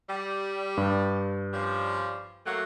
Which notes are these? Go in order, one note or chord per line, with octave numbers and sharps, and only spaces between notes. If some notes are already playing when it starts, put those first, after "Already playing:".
G3
G2
F3 G3 C#4
F#3 A3 A#3